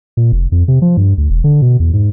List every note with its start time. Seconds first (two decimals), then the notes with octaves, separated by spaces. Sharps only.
0.17 A#2
0.32 F1
0.52 F2
0.68 C3
0.82 F3
0.97 G2
1.18 D2
1.30 E1
1.44 D3
1.62 B2
1.80 E2
1.93 G#2